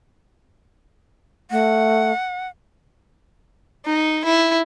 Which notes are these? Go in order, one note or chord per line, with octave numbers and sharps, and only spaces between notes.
A3 F#5
D#4
E4